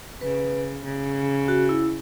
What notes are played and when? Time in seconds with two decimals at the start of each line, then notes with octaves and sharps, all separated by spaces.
0.21 C#3 B4
0.84 C#3
1.48 F#4
1.69 E4